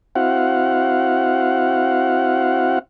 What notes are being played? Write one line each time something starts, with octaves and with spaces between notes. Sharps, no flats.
C4 E4 F#4 F5 F#5